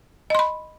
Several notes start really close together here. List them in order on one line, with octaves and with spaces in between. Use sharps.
D#5 C6 B5